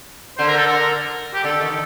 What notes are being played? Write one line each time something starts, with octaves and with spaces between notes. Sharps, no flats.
D3 C5
A#4
A4
A#4
G4
D3 A4
D#3